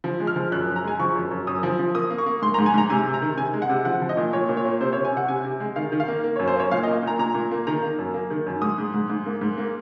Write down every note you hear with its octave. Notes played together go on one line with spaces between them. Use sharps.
F3
G#3
F6
F3
F#2 F#6
F#2
A#5
G#3 G#5
F3 C#6
F#2
F#2
F#2 D#6
F3
F3
A#3 D#6
A#3
C#6
A#3
G#2 C6
A#5
G#2
G#5
G#2 A#5
C3 G#5
C3
A#5
D#3
C3 G#5
G#3
F#5
C3
F3 F#5
F3
D#5
A#2
A#2 C#5
A#2
C#5
A#3
C3 C5
C#5
C3
G#5
C3 F#5
C3 G#5
C3
G#3
D#3 F5
D#3
F5
A#3
A#3
C#5
F#2
C5
A#3 C#5
A#2 F5
D#5
A#3
A#2 A#5
A#2 A#5
A#2
A#3
D#3 A#5
A#3
F#2
A#3
D#3
F#2
G#2 D#6
G#2
G#2
G#2
A#3
G#2
A#3